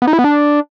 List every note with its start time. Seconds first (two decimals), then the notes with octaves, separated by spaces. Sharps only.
0.02 B3
0.07 D#4
0.13 E4
0.19 B3
0.24 D4